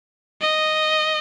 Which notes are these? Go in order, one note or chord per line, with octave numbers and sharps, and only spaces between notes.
D#5